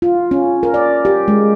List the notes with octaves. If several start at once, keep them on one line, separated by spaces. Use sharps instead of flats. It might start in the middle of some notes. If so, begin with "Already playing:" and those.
F4
C#4
A#4
D5
G4
G#3